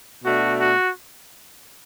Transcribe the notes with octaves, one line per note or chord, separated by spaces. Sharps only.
B2 A3 D4 F#4
F#4